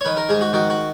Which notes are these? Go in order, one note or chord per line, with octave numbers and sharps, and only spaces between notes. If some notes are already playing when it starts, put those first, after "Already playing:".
C#5
D#3 B4
A#4
G#2 G#4
F#4
D#3 F#4
F#4